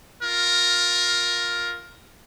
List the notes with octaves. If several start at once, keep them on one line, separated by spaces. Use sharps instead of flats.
F4 A#4